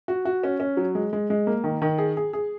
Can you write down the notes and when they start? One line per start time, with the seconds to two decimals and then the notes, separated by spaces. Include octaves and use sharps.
0.08 F#4
0.25 F#4
0.43 C#4
0.60 C#4
0.77 F#3
0.95 G#3
1.13 G#3
1.30 G#3
1.47 A#3
1.64 D#3
1.82 D#3
1.98 G#4
2.17 G#4
2.33 G#4